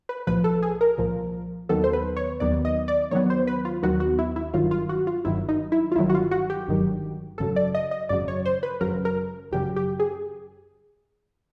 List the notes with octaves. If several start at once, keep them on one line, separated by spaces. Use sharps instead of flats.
B4
C2 A#2 F3 B4
A4
G#4
A#4
C2 A#2 F3
D#2 D#3 F#3 B3 A4
C5
B4
C#5
D#2 D#3 F#3 B3 D5
D#5
D5
D#2 D#3 F#3 B3 C#5
C5
B4
F4
D#2 D#3 F#3 B3 F#4
F#4
E4
E4
G1 G2 D#3 F#3 F4
F4
F#4
F4
G1 G2 D#3 F#3 E4
D#4
E4
F4
G1 G2 D#3 F#3 E4
F#4
F4
F#4
G4
G1 G2 D#3 F#3
G#1 F#2 C#3 F#3 A4
D5
D#5
D#5
G#1 F#2 C#3 F#3 D5
C#5
C5
B4
G#1 F#2 C#3 F#3 A#4
A#4
G#1 F#2 C#3 F#3 G4
G4
G#4